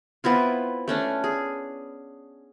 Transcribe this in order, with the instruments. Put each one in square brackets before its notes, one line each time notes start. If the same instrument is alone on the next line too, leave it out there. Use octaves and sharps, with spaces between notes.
[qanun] B3 C4 E4 F4
A3 C#4 D4
G#4